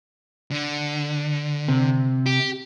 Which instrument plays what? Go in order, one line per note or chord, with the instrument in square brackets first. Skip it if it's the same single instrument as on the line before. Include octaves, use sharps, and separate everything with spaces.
[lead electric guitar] D3
[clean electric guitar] C3
[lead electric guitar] G4